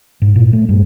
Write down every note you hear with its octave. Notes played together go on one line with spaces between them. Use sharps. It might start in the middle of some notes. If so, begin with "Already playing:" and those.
G#2
A#2
A3
G2